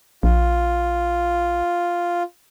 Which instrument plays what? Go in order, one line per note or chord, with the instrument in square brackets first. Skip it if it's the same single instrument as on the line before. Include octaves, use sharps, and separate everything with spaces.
[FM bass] A#1 [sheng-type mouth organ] F4